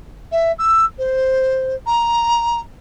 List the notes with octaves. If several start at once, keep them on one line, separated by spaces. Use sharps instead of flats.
E5
E6
C5
A#5